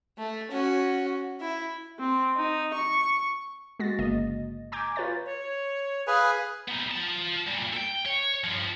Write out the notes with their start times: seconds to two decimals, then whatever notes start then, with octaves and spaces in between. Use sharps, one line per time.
0.18 A3
0.51 C#4 F#4
1.40 E4
1.99 C4
2.37 D#4
2.74 C#6
3.80 G#3 F#4 A6 A#6
3.99 G1 C#3 A#3 D#5
4.72 G#5 A#5 D6 G6 G#6
4.96 F4 B4 C#5 A6
5.25 C#5
6.07 G#4 B4 F5 G#5
6.68 B3 D#4
6.91 F4 A5
7.47 G2 A#2
7.73 A4 G5
8.06 C#5
8.44 G2 F3